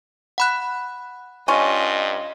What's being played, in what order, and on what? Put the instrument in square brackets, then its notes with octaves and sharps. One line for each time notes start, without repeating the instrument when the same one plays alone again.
[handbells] F#5 B5 F#6
[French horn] G2 [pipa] C#4 F4 [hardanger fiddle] D#5